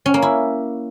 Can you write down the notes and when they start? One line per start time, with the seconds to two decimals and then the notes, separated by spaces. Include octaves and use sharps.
0.06 C#4
0.14 A#3
0.22 E4